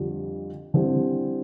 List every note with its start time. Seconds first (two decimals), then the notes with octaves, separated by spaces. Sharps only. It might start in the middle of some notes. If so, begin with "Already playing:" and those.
Already playing: F2 D3 G3
0.74 D3 G3 C4 E4